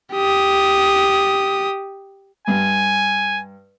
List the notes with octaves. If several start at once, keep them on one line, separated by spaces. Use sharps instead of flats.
G4 D#6
G2 G#5